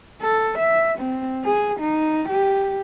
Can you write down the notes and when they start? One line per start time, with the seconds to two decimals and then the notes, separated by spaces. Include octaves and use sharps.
0.21 A4
0.59 E5
0.99 C4
1.44 G#4
1.80 D#4
2.29 G4